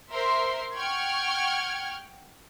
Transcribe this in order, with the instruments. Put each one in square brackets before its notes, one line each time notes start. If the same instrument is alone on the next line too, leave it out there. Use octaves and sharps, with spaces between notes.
[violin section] A#4 C5 E5 C6
F#5 G5 C#6 F6 G#6